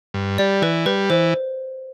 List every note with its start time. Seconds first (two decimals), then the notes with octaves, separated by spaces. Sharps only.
0.14 G2
0.38 G3 D5
0.62 E3 B4
0.86 G3 B4
1.10 E3 C5